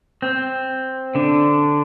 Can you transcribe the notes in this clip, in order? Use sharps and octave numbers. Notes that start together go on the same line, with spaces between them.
C4
D3 D4